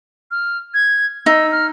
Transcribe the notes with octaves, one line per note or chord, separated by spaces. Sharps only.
F6
G#6
D#4 E6
F6